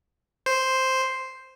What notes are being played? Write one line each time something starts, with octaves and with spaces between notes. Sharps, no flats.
C5